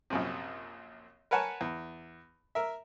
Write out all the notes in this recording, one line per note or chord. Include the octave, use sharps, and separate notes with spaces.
A#1 F#2 C3
A#4 B4 C#5 F#5 G#5 A5
E2
A#4 E5